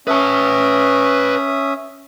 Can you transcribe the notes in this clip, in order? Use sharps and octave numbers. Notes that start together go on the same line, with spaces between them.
C#4 B4 E5 A5 D#6